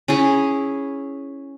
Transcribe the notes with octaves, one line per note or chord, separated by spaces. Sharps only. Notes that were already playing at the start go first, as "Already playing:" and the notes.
C#4 E4 G#4